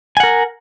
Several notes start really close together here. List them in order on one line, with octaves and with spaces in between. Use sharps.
G#5 F#5 A#4